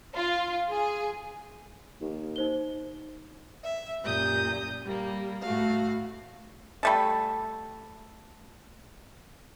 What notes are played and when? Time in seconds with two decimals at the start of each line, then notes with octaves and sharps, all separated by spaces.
0.16 F4
0.72 G#4
2.01 D#2
2.36 D#4 C5 G7
3.64 E5
4.04 F#2 A#2 G4 D#6 G6
4.85 G3 A#3
5.42 A2 A3 F#4 F5
6.83 G3 A3 A4